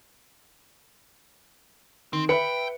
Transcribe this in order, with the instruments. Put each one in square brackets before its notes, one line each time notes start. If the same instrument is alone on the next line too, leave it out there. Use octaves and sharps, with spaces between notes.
[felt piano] D#3 [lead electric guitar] C4
[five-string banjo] B4 [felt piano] E5 B5 C#7 [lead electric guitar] G5